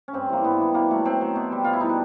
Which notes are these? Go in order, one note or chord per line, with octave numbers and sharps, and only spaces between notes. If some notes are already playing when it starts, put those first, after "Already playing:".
C#4
G2 C4
E3 G3 A#3
G2 B3
E3 G3
B2 A#3
F#3 A3
B2 C4
F#3
B2
G3
B2 F4
E4
G3 D#4
D4